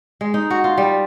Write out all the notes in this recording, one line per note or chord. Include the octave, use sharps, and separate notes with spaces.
G#3
D#4
F#4
F4
G3